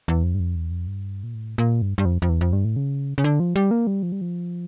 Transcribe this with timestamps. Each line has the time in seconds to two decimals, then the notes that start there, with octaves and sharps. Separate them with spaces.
0.08 E2
0.24 F2
0.34 G2
0.40 F2
0.56 E2
0.71 F2
0.87 G2
1.24 A#2
1.34 A2
1.58 A#2
1.82 G2
1.98 G2
2.05 F2
2.22 F2
2.29 E2
2.41 F2
2.53 G2
2.65 A2
2.76 C#3
3.18 C#3
3.24 D3
3.40 F3
3.56 G3
3.71 A#3
3.87 G3
4.03 F3
4.12 G3
4.21 F3